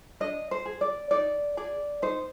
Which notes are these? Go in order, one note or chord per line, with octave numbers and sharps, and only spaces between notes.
D4 D#5
C5
G#4
D5
D#4 D5
G#4 D5
D#4 C5